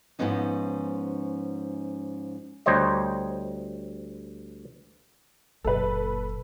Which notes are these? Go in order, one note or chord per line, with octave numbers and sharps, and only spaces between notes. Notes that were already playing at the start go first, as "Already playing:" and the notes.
G#2 C3 F3 B3 C#4 D#4
D2 G3 C5 C#5 D#5
F#1 A#2 A4 B4